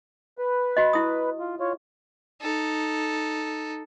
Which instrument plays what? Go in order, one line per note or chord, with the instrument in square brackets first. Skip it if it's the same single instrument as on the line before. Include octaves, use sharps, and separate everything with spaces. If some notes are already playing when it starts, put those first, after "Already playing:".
[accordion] B4
[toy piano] F#4 D#5
E4 D#6
[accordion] F4
F4 C#5
[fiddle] D#4 A4